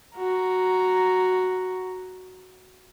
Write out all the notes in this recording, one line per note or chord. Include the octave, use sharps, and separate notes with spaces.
F#4 A#5